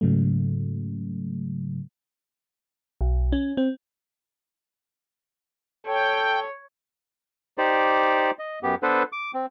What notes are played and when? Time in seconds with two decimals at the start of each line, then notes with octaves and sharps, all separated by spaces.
0.01 G#2 C#3 F#3 A3
3.01 B1
3.32 C#4
3.57 C4
5.87 A4 C#5 G5
7.58 D#4 G4 C5 D5
8.39 D#5
8.63 F#2 B3 G4
8.83 B3 D4 A4 B4 C5
9.12 D6
9.34 C4